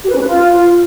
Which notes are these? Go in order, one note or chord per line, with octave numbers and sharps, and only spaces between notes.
G4
B4
C#4
B4
F4